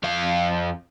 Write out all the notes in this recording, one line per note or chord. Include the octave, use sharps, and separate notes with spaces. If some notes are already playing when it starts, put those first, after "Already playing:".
F2 F5